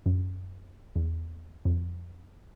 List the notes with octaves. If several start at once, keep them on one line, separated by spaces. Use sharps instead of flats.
F#2
E2
F2